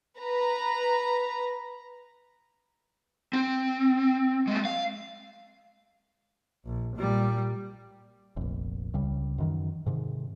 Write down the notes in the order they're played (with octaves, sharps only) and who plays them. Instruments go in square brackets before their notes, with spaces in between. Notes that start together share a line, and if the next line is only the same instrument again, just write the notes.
[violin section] B4 A#5
[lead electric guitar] C4
G#3 A3
F5
[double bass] A#1
A#2 G3
[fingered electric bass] F1 A#1
C#2 C#3 G3
F#2 D#3 E3
G#2 C3 D#3